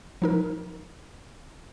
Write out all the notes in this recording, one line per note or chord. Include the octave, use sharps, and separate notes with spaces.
F3 D#4 A#4